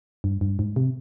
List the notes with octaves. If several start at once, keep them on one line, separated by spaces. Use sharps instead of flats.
G2
G2
G#2
C3